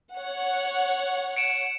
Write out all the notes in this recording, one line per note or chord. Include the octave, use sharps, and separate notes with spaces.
C#5 F#5
C#7 D7 E7